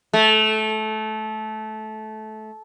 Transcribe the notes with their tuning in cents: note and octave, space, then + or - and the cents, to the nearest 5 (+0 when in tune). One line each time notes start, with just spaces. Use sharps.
A3 -20